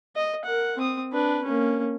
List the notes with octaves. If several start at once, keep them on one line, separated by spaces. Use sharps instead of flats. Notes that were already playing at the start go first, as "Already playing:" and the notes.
D#5
A#4 F#5
C4 D#6
D4 B4
A#3 C#4